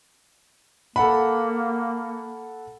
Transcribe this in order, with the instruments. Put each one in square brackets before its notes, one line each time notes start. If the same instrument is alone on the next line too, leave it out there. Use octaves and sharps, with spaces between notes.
[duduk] A#3 [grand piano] A4 F#5 B5